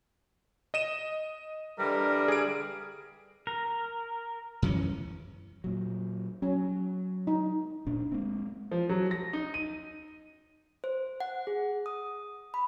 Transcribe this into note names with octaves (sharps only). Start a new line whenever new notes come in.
D#5 D#7 E7
D3 E3 G3 A#4
G#4 D7
A#4
F#2 E3 C#4
A#2 F#3
F#3 C#4
D#4
D1 A#2 D4
G#3 A#3 C4
F3
F#3
A#6
D#4
D#7
C5
F#5
G#4
D#6
B5